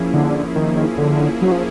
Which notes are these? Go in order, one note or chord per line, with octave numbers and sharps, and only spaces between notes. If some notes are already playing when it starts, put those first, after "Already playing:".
Already playing: F3 A#3 C#4 E4 G#4
D3
D#3
D3
F#3
F3